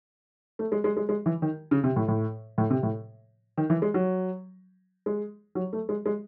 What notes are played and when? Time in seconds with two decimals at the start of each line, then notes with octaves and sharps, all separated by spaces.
0.59 A3
0.72 G#3
0.84 G#3
0.97 G#3
1.09 G#3
1.26 E3
1.42 D#3
1.71 C#3
1.84 C3
1.96 A2
2.08 A2
2.58 A2
2.70 C3
2.83 A2
3.57 D#3
3.70 E3
3.82 G#3
3.94 F#3
5.06 G#3
5.55 F#3
5.73 A3
5.89 G#3
6.06 G#3